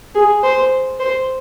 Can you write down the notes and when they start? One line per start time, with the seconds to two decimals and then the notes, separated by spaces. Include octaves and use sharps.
0.15 G#4
0.43 C5
0.99 C5